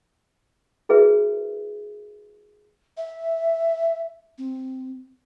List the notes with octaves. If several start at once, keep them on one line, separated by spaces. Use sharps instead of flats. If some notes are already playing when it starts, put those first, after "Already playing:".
E4 F#4 G#4 A#4 B4 E5
E5
C4